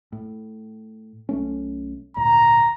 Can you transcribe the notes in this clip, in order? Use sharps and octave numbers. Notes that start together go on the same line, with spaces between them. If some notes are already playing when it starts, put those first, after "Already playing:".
A2
B1 A3 C#4
G#1 D2 A#2 A#5